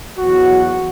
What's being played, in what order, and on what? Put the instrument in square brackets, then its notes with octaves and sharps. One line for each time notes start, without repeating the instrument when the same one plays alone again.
[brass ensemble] E2 B2 F#3 F#4